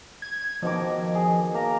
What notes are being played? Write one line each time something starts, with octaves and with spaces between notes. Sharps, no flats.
G#6
B2 D#3 F3 D6
G#4
A#3 A#5